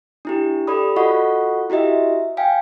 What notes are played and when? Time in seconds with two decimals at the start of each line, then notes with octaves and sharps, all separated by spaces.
0.25 D4 E4 G4
0.67 G4 A4 D5 B5 D#6
0.96 F4 F#4 A4 D#5 F#5 C#6
1.70 E4 F#4 G4 D#5 E5
2.37 F5 G5 G#5